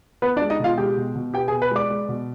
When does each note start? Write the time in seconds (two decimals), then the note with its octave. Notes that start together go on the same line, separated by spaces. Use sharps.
0.22 B3 B4
0.36 D4 D5
0.41 G#3
0.50 D#4 D#5
0.59 B2
0.64 F4 F5
0.78 G#3 G4 G5
0.96 B2
1.15 B2
1.34 B3 G4 G5
1.48 G#4 G#5
1.53 B2
1.62 B4 B5
1.71 G#3 D5 D6
1.90 G#3
2.08 B2